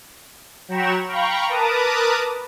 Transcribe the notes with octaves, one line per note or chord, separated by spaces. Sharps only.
F#3 G5 A#5 B5 C#6 E7
F5 G5 A#5 B5 C#6
A#4 B4 A5 A#5 D6 D#6